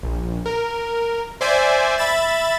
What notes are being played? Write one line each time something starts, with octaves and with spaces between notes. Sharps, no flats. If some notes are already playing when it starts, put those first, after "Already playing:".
A#1
A#4
C5 D5 E5 G#5
E5 B5 A6 E7